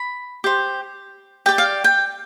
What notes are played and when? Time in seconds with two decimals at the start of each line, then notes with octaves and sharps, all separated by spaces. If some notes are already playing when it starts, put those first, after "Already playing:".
Already playing: B5
0.44 G4 C5
1.46 G4 G5
1.49 D5
1.58 F5
1.84 G5